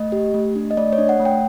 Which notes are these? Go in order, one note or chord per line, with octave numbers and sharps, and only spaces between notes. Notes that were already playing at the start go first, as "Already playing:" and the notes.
Already playing: A3 D#5
G4
A3
D4
D#5
A3 D5
C#5
D4
F#5
A3
G5